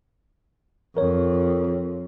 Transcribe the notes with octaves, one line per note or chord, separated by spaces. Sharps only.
F2 A#4 C#5